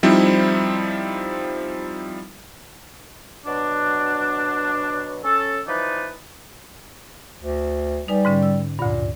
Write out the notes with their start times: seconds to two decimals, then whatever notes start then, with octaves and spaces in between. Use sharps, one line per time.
0.03 F3 G3 C4 D#4 E4
3.46 B2 F#3 D4
5.24 C#4 A4
5.68 E3 F3 D#4 B4 D5
7.43 D2
8.08 G3 D#4 B4 G#5
8.25 G#2 D3 C#4
8.43 E6
8.79 D2 G2 A#2